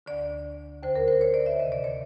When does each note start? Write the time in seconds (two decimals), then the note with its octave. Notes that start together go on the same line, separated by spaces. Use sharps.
0.06 D2 D3 D5
0.83 D#2 D3 C5
0.96 A#4
1.08 C5
1.21 C#5
1.34 D5
1.46 E5
1.59 D2 C3 D#3 D#5
1.72 D5
1.84 C#5